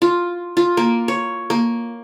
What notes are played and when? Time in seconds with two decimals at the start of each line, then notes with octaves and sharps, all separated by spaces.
0.02 F4
0.57 F4
0.77 A#3
1.08 C#5
1.50 A#3